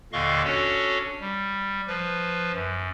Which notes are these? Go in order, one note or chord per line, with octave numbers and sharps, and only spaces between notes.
D#2 A#2 D3 D#5 F5 C#6
C#4 D4 F#4 A4 C#5
G3
F3 B4
F#2